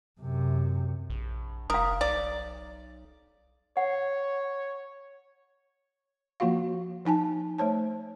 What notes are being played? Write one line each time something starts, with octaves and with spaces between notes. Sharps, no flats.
F#2 C3
A#1
F1 A#4 F5 D#6
B1 D5
C#5 F#5
F3 A#3 F4 F#4 F5
F3 D#4 G#5 A5
A3 C5 C#5 A5